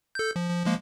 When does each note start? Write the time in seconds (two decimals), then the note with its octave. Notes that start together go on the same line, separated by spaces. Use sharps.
0.15 A4 G6
0.36 F3
0.49 F3
0.66 F3 G#3 A#3